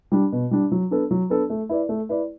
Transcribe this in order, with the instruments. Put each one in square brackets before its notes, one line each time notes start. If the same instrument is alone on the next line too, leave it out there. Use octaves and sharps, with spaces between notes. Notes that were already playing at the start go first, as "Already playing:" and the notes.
[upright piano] G3 D4
B2
G3 D4
F#3
B3 D4 A4
F#3
B3 D4 A4
A3
E4 B4 D5
A3
E4 B4 D5